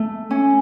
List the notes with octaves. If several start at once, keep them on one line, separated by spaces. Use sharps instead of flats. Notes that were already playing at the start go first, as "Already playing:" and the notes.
Already playing: A3
C#4